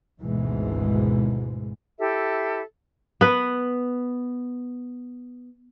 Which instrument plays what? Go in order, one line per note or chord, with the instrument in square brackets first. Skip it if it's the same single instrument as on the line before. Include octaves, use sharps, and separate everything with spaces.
[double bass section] G#1 D2 G#2 B2 E3 G#3
[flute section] E4 G4 A4 E5
[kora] B3 B4